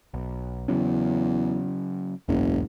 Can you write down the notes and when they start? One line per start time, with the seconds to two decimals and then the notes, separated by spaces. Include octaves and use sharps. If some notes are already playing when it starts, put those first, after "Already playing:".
0.14 B1
0.68 E2 C#3 F#3 C#4
2.28 F#1 B1 E2 G#2